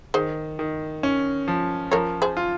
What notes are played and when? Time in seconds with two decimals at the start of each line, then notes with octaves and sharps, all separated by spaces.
0.14 D#3 G#4 C5
0.59 D#3
1.03 C#4
1.48 F3
1.92 F3 A#4 C#5
2.22 G#4 C5
2.37 F4